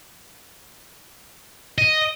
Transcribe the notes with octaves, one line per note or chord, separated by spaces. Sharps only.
D#5